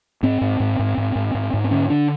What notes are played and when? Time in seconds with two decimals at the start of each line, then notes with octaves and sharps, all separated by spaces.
0.23 G#2 C4
0.41 G#2
0.60 G#2
0.79 G#2
0.98 G#2
1.15 G#2
1.35 G#2
1.54 G#2
1.64 C4
1.71 D3 C#4
1.90 D3 D4